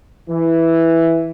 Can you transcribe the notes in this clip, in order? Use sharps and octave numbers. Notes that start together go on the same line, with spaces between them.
E3